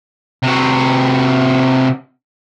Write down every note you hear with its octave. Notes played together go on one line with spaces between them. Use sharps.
C3 F#4